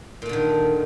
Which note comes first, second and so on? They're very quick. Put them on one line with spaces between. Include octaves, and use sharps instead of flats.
A#2 A3 D3 D#3